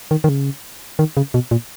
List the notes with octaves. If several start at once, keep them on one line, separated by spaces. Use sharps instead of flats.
D#3
D#3
C#3
D#3
C#3
B2
A#2